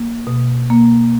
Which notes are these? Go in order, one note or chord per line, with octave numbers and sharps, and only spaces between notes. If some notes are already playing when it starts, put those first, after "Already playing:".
Already playing: A#3
B2
A#3